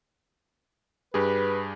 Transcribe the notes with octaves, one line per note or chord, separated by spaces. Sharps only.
G2 G4 G#4 B4